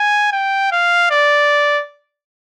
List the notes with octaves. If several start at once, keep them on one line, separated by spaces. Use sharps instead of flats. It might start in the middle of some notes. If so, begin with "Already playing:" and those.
Already playing: G#5
G5
F5
D5